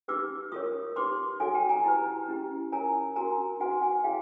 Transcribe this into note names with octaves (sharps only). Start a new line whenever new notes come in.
D#4 G4 B4 D6 E6
F4 A#4 C#5 C#6 D#6
D#4 G4 B4 C6 D6
D#4 F#4 A4 C#5 F#5 G#5
G5 A5
G#5 A#5
E4 G4 B4
C#4 E4 G4
F4 A#4 C#5 G#5 A#5
D4 F#4 A#4 G#5 A#5
D#4 F#4 B4 F#5 G#5
F#5 G#5
E4 G#4 C#5 F5 G5